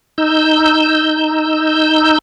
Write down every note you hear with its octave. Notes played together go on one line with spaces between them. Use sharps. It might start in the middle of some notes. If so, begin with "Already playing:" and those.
D#4 E6 G6